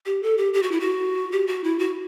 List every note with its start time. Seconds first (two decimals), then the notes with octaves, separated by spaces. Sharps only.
0.06 G4
0.23 A4
0.38 G4
0.54 G4
0.63 F#4
0.71 E4
0.80 F#4
1.32 G4
1.47 F#4
1.64 E4
1.79 F#4